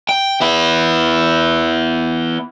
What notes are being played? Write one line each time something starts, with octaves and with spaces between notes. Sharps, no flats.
G5
B3 E4